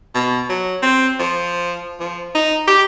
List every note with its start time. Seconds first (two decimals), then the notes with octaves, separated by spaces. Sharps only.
0.15 B2
0.49 F#3
0.83 C4
1.19 F3
2.00 F3
2.35 D#4
2.68 G4